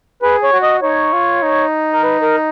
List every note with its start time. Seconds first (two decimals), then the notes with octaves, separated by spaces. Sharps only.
0.22 G#4 B4
0.43 C#5
0.53 F#4
0.63 D#5
0.82 D#4 C#5
1.13 F4
1.42 D#4
1.92 A#4
2.03 B4
2.22 A#4